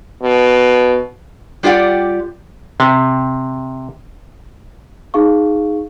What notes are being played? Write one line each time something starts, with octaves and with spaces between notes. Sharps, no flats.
B2
G3 F4 G4 D5 F#5
C3
D#4 G#4 F5 C#6